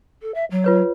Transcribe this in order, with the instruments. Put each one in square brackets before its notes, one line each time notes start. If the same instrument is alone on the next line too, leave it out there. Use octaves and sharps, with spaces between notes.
[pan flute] A4
E5
F#3
[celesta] F4 B4 C#5